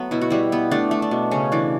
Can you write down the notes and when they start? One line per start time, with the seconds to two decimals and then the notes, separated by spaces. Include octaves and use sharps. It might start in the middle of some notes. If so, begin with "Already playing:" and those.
Already playing: F#3 A3 B3
0.11 B2 E4
0.21 F#4
0.30 G3 E4
0.52 B3
0.71 A3 D4
0.91 A3
1.02 D4
1.11 B2
1.31 C#3 C#4
1.52 E3 D4